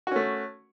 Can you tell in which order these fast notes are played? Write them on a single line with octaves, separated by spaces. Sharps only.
F#4 C#4 A3